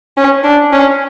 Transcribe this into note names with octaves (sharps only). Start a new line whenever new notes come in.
C#4
D4
C#4